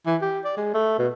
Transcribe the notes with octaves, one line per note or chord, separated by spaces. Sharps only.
E3
G4
D5
G#3
A3
B2